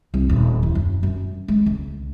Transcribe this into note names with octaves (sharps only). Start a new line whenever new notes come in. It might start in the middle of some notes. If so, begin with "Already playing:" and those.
C2
D#1
E3
F#2
F#2
G#3
C#2